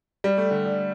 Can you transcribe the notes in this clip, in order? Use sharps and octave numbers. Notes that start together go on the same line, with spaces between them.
G3
A3
D3
D3